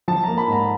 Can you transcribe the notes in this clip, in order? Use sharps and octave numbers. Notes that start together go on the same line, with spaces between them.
F3 A5
A#3 A#5
B5
G#2 A#5